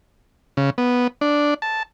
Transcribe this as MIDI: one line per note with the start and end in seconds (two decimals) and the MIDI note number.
0.57 0.70 49
0.78 1.07 59
1.21 1.54 62
1.62 1.83 81